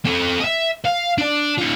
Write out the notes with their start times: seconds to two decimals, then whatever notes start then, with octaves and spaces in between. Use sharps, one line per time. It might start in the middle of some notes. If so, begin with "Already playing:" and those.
0.05 C4 A4
0.40 D#5 E5
0.85 F5
1.18 D4 D5
1.58 D#4 F4